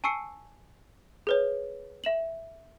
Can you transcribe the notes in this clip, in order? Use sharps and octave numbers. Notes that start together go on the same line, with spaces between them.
G#5 A5 C#6 E6 C7 C#7
G#4 B4 C#5
E5 E7 F#7